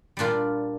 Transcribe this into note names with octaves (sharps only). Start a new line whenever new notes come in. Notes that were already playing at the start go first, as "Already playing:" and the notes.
A#2 G3 D4 F4